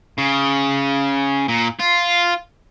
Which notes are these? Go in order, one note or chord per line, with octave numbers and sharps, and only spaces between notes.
C#3
A#2
F4